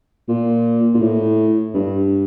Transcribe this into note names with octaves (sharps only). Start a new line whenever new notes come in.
A#2
A#2
A2
G2